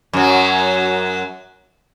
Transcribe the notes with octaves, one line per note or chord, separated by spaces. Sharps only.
F#2 F#3